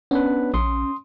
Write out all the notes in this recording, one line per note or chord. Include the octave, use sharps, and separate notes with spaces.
B3 C#4 D4 B4
A#1 C6 D#6